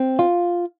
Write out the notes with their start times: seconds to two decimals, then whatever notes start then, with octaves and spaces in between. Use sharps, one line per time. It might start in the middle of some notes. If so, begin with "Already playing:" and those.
Already playing: C4
0.19 F4